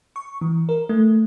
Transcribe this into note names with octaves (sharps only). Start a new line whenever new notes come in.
C#6
E3
A#4
A3